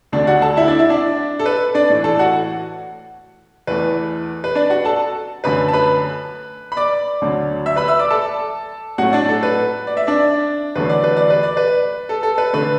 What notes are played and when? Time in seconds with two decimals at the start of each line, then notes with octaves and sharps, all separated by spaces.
0.12 D2 D3 A3 D4 D5
0.27 F#4 F#5
0.42 A4 A5
0.57 E4 E5
0.68 D4 D5
0.79 E4 E5
0.90 D4 D5
1.39 A4
1.46 B4
1.75 D4 D5
1.90 A2 E3 A3
2.04 A4 A5
2.19 F#4 F#5
3.67 E2 E3 A3 B4
4.44 B4
4.55 D4 D5
4.70 F#4 F#5
4.85 A4 A5
5.44 F#2 D3 A3 B4 B5
5.68 A5
5.73 B4 B5
6.72 B5
6.77 D5 D6
7.22 D2 D3 F#3 A3
7.66 E5 E6
7.76 B4 B5
7.88 E5 E6
7.99 D5 D6
8.10 A4 A5
8.98 A2 F#3 A3 F#4 F#5
9.13 D4 D5
9.29 A4
9.43 B4
9.87 D5
9.97 E5
10.07 D4 D5
10.75 E2 D3 F#3 A3 B4
10.89 D5
11.04 B4
11.17 D5
11.30 B4
11.43 D5
11.57 B4
12.09 A4
12.23 A4
12.38 B4
12.53 D3 A3 B4